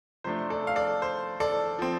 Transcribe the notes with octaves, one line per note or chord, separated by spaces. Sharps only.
C3 F3 A3 D4 C5
A4 D5
F5
A4 D5
C5
A4 D5
F3 C4